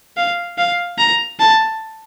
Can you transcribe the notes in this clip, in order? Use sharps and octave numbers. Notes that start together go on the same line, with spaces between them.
F5
F5
A#5
A5